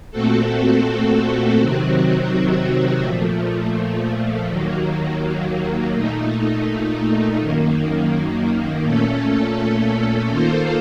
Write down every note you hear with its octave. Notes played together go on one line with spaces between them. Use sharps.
A#2 A3 C4 F#4 A4
C3 D#3 F#3 C4 F#4
A#2 F3 A3
D#2 D#3 F#3 A#3
A#2 A3 D#4
F#2 D#3 A#3
A#2 A3 C#4 A4
D#3 A#3 F4 A4 C5